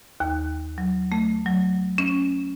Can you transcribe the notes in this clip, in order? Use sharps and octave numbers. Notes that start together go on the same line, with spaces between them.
D#2
F#3
A3
F#3
C#4